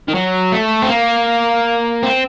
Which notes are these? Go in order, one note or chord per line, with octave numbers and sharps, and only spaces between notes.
D#3
F#3
A3
C4
A#3
C4